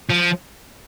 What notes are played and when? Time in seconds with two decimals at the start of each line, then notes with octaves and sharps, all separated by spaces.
0.10 F3